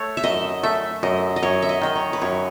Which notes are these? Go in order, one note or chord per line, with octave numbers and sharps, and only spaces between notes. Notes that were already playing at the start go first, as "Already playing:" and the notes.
Already playing: A3 C#5
E5
F#2 D#5
A3 E5
F#2 D#5
D#5
F#2 C#5
E5
D#5
D#3 D#5
C#5
B4
F#2 C#5